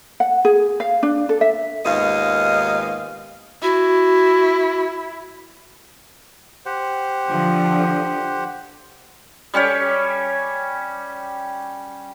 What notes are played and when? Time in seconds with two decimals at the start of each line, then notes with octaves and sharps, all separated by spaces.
0.20 F#5
0.45 G#4
0.80 F5
1.03 D4
1.29 A4
1.41 E5
1.85 D#2 G#2 B3 F4 D#5 F5
3.62 E4 F#4
6.66 G4 C5 F#5
7.28 D3 F3
9.54 G3 C#4 G4 C#5